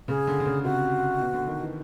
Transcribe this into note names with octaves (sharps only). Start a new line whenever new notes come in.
C#3 G#4
D3
D3
C#3
C3 F#4
B2
D3
D#3
E3